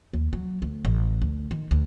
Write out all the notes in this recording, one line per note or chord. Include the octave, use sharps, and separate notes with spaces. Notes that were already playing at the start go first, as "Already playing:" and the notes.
D#2
F#3
D2
A1
D2
D#3
D2